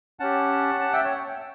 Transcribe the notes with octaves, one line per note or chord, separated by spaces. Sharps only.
C#4 G4 F#5 A5
A5
E5 G5
C#5